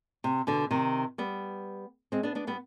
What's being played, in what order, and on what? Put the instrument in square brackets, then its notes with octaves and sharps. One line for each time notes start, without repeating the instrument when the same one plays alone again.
[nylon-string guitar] C3
B2 D3
C3 D#3
G3 B3
G#3 C4
B3 D4
B3 D4
G3 B3